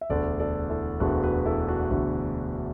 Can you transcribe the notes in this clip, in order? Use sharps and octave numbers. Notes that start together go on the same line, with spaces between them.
E5
E1 D2 D3 A4 D5
A4 D5
E4 A4
E1 D2 D3 F#4 B4
F#4 B4
E4 A4
D4 F#4
E1 D2 D3